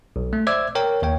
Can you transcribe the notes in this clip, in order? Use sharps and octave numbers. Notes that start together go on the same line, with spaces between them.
B1
A3
C5 D5 E5 D6 E6 G#6
A#4 C#5 G5
D#2 C#5 G5